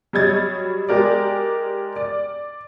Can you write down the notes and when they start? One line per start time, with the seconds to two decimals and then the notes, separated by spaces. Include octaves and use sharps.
0.13 F#3 G3 D#5 G#6 A6
0.89 G#3 G4 A#4 D5
1.96 D5